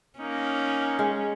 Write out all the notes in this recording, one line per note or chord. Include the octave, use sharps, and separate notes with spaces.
A#3 C#4 D#4
G#3